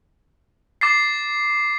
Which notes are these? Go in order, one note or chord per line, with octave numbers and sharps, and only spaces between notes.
D6 A6 C7